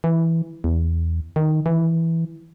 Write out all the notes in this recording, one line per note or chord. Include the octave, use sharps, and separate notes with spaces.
E3
E2
D#3
E3